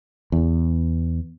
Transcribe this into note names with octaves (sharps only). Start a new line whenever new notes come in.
E2